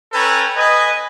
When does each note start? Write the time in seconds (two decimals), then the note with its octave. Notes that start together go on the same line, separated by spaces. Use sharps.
0.13 C#4 A4 B4 G5 G#5 A#5
0.57 B4 D#5 G#5